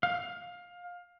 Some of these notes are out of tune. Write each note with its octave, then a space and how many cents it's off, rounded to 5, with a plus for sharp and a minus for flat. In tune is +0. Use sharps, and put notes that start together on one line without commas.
F5 +20